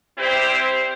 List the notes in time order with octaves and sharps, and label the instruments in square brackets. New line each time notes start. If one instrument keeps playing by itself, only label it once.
[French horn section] G3 C4 E4 G4 C5